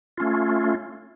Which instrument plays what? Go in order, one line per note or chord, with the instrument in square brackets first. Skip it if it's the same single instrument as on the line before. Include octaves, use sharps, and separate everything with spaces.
[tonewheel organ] A3 C#4 F4